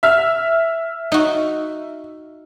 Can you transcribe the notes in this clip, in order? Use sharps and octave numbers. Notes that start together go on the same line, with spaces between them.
E5 F6
D#4 F#4